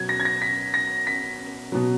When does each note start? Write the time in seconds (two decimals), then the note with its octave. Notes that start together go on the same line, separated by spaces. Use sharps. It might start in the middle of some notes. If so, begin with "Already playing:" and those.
Already playing: B2 F#3 G#6
0.09 A#6
0.20 G#6
0.25 A#6
0.42 B6
0.74 A#6
1.07 B6
1.72 B2 F#3